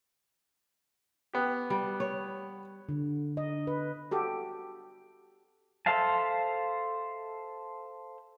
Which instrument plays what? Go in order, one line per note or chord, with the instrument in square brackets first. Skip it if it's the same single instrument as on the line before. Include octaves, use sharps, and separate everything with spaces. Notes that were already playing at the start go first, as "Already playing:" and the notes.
[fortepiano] B3 G4
[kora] G3
C#5
[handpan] D3
D#5
B4
[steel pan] F#4 G4 A4
[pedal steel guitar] A4 C5 E5 F5 A5